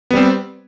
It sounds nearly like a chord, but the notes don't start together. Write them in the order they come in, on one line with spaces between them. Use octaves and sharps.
B3 G3 C4